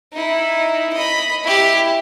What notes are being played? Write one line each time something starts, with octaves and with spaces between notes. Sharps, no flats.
D#4 E4
D#5 B5
E4 G4